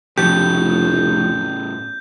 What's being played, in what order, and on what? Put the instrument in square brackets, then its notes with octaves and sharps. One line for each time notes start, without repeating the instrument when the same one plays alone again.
[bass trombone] F1 [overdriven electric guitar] A2 C#3 [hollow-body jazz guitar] F3 F#3 G4 [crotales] G6